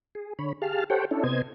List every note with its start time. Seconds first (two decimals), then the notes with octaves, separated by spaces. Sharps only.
0.15 G#4
0.39 D3 C#5 B5
0.62 G4 G#4 F5 A5 F6
0.90 G4 A4 C5 C#5 F#5 G5
1.11 C#4 D4 E4 A4
1.24 C3 B3 C5 D#5 G#6